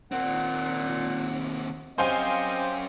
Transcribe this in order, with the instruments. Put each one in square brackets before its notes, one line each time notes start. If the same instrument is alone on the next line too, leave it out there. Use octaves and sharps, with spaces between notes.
[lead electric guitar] D#2 C4 [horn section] A#2 [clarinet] F#5
[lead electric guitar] F#2 C#4 [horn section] C4 G4 [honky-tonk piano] C5 F5 G#5 [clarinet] D#5